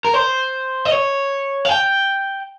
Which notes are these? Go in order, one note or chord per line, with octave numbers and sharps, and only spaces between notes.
A#4
C5
D#5
C#5
F5
G5